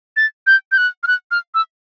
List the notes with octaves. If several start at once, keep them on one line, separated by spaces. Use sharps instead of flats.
A6
G6
G6
F#6
F6
F#6
F6
E6